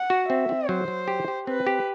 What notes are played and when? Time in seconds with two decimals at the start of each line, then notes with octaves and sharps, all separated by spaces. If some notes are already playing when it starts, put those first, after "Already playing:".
Already playing: F#5
0.10 F#4
0.29 C4 E5
0.49 C4
0.68 F#3 C5
0.88 F#3
1.08 G4
1.28 G4
1.47 C4 B4
1.67 G4